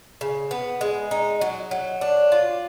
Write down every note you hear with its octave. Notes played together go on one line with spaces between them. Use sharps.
C#3
B3
G#3
D#4
F#3
F#3
D4
F4